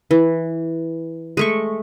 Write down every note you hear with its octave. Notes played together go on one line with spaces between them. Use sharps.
E3
G#3 A3 C#6